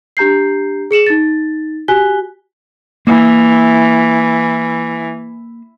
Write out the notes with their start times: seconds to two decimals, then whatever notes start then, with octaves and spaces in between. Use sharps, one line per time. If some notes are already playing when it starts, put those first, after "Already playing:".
0.17 D4 G4 A#5 G6 C7
0.91 G#4 C#7 E7 F#7
1.07 D#4 A6
1.88 F#4 G4 G#5 F#6 B6 G7
3.07 E3 A#3